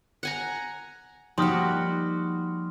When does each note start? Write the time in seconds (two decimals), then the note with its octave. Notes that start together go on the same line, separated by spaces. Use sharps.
0.23 F#5 G#5 A#5
1.38 F3 G3 A#3 D#4 F#4 C6 D#6 F6